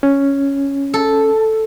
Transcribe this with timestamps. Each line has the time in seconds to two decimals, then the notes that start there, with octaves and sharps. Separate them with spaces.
0.03 C#4
0.94 A4